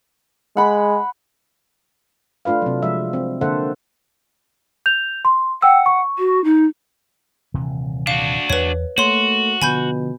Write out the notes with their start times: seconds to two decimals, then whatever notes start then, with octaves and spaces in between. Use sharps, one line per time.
0.57 G#3 F#5 B5
2.45 A3 D4 F4 B4 F5
2.62 C3 F#3
2.82 F3 G#3 E5
3.13 C4
3.41 D3 A#3 A4 C5 E5 F#5
4.86 G6 F7
5.25 C6
5.62 F#5 G5 E6
5.86 C#6
6.18 F#4
6.44 D#4
7.54 D#1 C3 E3
8.07 D4 F#4 F5
8.50 E2 B4 C#5
8.98 A3 A#3 F#4 C#5 C6
9.62 B2 D3 F3 G#5 B5 G6